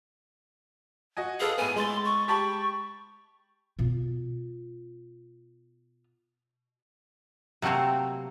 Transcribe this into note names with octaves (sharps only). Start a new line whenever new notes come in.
F#4 D#5 G#5
G#4 A4 B4 F5
A2 B3 G#5
G#3 C6 A6
C#6
G4 A5 B5 C#6
B2 F4
C3 F#3 A3 A#3 C4